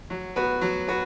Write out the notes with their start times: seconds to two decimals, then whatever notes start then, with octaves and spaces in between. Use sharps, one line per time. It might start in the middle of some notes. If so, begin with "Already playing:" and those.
0.10 F#3
0.36 B3 F#4 B4
0.61 F#3
0.88 B3 F#4 B4